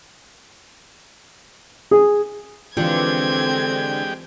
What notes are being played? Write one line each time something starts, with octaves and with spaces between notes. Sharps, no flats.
G#4
D3 E3 G#3 C4 F4 G4 G5 G#6